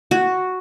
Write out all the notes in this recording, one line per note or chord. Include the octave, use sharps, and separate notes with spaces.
F#4